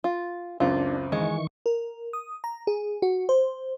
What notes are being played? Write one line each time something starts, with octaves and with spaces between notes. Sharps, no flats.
F4
C#2 F#2 C4 D4 F4
D#3 E3 G#3 C#6
A#4
D#6
A#5
G#4
F#4
C5